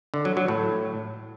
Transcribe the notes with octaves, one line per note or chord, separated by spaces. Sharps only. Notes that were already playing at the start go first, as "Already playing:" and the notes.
D3
F#3
F#3
A2